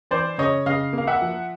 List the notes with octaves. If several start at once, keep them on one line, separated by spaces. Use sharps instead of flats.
E3 C5 D5
C#3 C#5 D#5
C#3 D#5 F5
A#3 F5
E5 F#5
F3